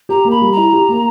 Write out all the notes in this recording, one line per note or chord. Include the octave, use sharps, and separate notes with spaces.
G4 A#5
A#3
B5
G3
E4 A#5
G4
A#3